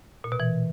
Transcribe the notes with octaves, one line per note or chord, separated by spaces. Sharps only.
A#2
B2
E3